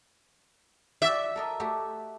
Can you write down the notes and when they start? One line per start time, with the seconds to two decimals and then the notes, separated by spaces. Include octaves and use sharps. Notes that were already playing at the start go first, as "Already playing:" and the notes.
1.02 F#4 D5 E5 G5
1.36 A4 A#4 D#5
1.60 A3 F#4 G4